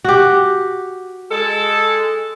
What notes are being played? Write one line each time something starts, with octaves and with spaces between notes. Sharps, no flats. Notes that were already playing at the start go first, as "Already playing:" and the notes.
F#4 G4
G#3 A4